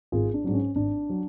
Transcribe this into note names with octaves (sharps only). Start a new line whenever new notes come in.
G#1 F4 G#4
D4
G#2 F#3 D4
C#4
G#1 D4
F#3